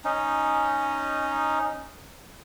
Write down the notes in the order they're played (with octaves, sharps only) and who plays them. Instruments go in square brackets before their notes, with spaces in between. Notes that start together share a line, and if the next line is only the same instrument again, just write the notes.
[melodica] C#4 D#4